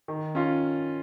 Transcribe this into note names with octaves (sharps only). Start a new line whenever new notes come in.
D#3
C#4 F4